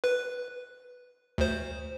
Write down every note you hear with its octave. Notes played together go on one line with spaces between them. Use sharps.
B4
D2 C5